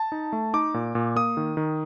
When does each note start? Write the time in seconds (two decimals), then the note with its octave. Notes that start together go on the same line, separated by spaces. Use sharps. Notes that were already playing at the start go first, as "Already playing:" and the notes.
Already playing: A5
0.12 D#4
0.33 A3
0.53 D#4 D6
0.74 A#2
0.95 A#2
1.16 A#3 D#6
1.37 D#3
1.57 D#3